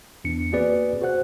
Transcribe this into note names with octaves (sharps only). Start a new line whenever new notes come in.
E2 D4 C#7
A#3 C4 F#4 G#4 B4 D5
F#4 G#4 C5 F#5 F#6